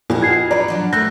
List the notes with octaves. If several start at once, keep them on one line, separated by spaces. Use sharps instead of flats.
F2 A#2 E4 F#4 A#4
F4 G#5 G#6 C7
G4 B4 C#5 D5 A#5
F3 F#3 D4
F#3 A3 C4 E6 F#6 G6 A#6